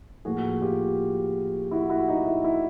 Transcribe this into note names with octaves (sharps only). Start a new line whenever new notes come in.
A2 F3 A#3 F#4 G#4
F4 G4
E4 F#4
E4 F#4
D#4
E4
E4